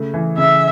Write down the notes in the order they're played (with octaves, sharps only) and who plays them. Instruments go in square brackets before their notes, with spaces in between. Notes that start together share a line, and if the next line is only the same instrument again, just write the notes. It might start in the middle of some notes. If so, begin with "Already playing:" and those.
Already playing: [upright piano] C#3 A3
E3
[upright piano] C#3 [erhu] E5